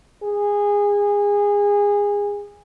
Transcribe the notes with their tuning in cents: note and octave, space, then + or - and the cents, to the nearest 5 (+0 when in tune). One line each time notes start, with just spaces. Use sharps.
G#4 -25